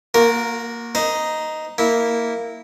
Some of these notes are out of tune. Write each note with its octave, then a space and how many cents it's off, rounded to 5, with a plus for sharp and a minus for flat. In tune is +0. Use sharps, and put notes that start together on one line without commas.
A#3 +0 F#4 -35 A#4 +0
D#4 +0 C5 -30
A#3 -5 E4 -15